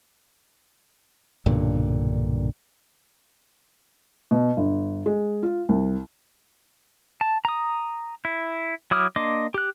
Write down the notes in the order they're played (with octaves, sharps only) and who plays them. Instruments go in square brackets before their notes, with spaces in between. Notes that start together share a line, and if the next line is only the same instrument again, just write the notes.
[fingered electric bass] B1 G2 A#2 D3
[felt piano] B2
G1
G#3
F4
C2
[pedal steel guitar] A5
A#5 D#6
E4
F#3 E4 D6 D#6 F6
A#3 D4 D#5 C6 D6
G4 F#6